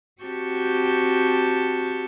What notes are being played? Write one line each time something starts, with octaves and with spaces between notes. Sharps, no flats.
C4 F#4 G4 A5 C#6 G6